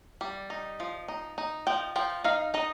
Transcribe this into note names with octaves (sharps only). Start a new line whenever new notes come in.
G3
D#4
F3
D#4
D#4
F3 G5
F3 G5
D#4 F5
D#4 D#5